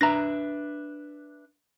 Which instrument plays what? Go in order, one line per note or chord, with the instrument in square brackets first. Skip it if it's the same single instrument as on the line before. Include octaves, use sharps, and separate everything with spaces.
[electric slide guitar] D4 B4 E5 [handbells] A#5 A#6